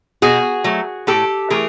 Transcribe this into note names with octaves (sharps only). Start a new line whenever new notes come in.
B2 F#4 G#4
F#3 A3
A2 G4 A4
E3 A3 G#4 A#4